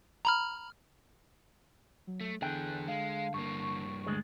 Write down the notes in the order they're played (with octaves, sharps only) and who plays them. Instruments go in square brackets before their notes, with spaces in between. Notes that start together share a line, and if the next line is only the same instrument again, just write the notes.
[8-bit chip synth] A#5 B5 F6
[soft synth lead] F#3
[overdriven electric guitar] A3
[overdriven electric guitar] E2 G#4 [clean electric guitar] D3 G5 [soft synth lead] F#6
[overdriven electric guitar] G#3 [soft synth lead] F5
[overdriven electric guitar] G2 A#3 [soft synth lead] C#6
[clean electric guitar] D2 G#3 G#4